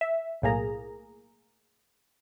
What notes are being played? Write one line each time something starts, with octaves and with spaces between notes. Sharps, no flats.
E5
B1 A2 A#3 G#4 A#5